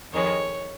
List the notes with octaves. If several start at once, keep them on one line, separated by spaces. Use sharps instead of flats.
F2 D#3 G#3 C#5